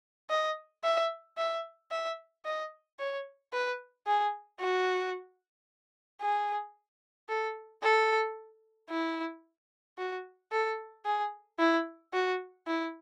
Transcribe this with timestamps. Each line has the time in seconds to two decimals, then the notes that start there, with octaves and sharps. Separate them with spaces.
0.30 D#5
0.84 E5
1.37 E5
1.91 E5
2.45 D#5
2.99 C#5
3.53 B4
4.07 G#4
4.60 F#4
6.21 G#4
7.29 A4
7.83 A4
8.90 E4
9.98 F#4
10.52 A4
11.05 G#4
11.59 E4
12.13 F#4
12.67 E4